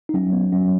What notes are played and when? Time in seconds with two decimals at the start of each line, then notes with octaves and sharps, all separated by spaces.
0.09 D#4
0.14 F#3 C#4
0.33 B3
0.52 F#3 C#4